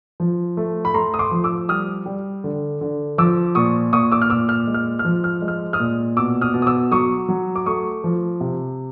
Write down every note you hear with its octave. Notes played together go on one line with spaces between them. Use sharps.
F3
A3
B5
A3 A#5 C6
D#6
C6 D6
F3
D6 E6
G3 D#6 F6
G3
D3
D3
F3 D6 E6
A#2 C#6 D#6
A#2 C#6 D#6
D6 E6
F6
A#2 D6 E6
F6
G#3
F6
F6
F3
F6
G#3
F6
D#6 F6
A#2
B2 D6 E6
D#6 F6
B2
D#6
D6 E6
F#3 C#6 D#6
F#3
D6
A3 C#6 D#6
F3
C3